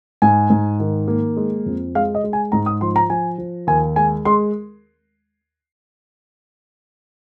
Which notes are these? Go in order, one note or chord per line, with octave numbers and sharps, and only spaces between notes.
G#2 G#5
G#2
D#3
A#3
G#3
F2
G#3 F5
D#5
G#3
G#5
G#2 A#5
D#6
F3 C6
A#5
F3 G#5
F3
D#2 G#5
G#3 G#5
G#3 C6